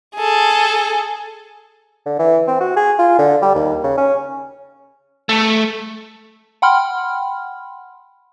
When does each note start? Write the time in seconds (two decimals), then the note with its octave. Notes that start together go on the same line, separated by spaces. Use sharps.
0.15 G#4 A4
2.06 D3
2.19 E3
2.47 C4
2.61 F#4
2.76 G#4
2.99 F4
3.19 D3
3.42 G3
3.55 D#2
3.84 C#3
3.97 C#4
5.29 A3
6.62 F#5 G5 B5 C6 F6